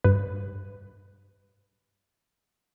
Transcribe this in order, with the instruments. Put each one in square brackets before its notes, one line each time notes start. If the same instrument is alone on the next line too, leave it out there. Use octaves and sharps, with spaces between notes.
[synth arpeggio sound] G2 B4